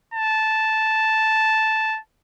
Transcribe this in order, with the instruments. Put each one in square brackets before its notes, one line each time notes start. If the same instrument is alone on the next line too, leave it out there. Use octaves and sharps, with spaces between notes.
[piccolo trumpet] A5